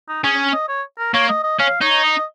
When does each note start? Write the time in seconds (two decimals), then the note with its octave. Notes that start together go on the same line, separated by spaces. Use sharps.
0.09 D#4
0.24 C#4 G#4
0.53 D#5
0.68 C#5
0.98 A#4
1.14 A#3 C#5
1.29 D#5
1.43 D#5
1.59 C#4 F5
1.81 D#4 C#5
2.03 D#5